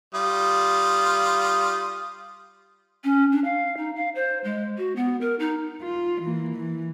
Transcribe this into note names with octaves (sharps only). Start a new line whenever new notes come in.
G3 F4 D#6
C#4
D4
F5
D#4
F5
C5
G#3
F#4
B3
A#4
D#4
F4
E3 A#3
E3